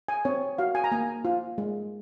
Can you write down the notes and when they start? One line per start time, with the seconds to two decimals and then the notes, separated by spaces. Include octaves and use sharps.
0.08 G#5
0.25 C4 C#5
0.58 F#4 F5
0.75 G#5
0.84 A#5
0.92 A#3 G#5
1.25 F4
1.58 G#3